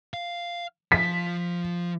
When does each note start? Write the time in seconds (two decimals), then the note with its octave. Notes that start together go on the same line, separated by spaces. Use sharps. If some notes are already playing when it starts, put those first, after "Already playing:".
0.14 F5
0.92 F3 B6